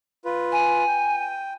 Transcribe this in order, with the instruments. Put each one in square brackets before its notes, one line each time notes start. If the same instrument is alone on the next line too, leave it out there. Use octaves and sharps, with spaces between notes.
[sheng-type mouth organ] F4 B4
[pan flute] G#5
[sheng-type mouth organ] G5